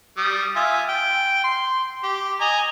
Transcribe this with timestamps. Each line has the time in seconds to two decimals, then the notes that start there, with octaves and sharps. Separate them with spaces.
0.17 G3 D#6
0.56 F4 E5 G#5
0.89 G5
1.44 C6
2.03 G4
2.41 D#5 G#5 A#5